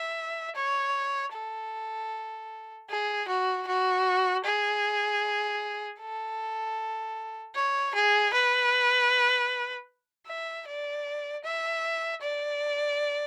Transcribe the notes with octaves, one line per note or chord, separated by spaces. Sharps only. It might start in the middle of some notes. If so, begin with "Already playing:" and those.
Already playing: E5
C#5
A4
G#4
F#4
F#4
G#4
A4
C#5
G#4
B4
E5
D5
E5
D5